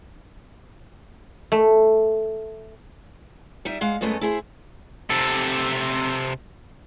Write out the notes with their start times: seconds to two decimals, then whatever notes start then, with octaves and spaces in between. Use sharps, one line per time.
1.52 A3
3.65 G3 D#4 E5
3.81 G#3 F5 F#5
4.01 F#2 C#3 G#3 A3 B3 D#5
4.21 E4 G#4 C5
5.10 C3 A4